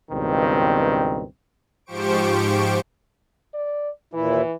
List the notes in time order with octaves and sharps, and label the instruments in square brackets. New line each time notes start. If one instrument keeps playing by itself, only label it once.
[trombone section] C#2 G2 B2 D#3 C4
[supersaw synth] G#2 F3 G4 C5 C#6 D7
[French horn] D5
[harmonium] D#2 A#2 E4 [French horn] E3